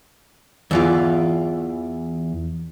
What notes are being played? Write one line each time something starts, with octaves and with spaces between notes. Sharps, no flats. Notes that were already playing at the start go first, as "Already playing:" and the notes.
E2 E3 F4